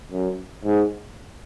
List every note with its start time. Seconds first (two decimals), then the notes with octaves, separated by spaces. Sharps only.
0.12 F#2
0.65 G#2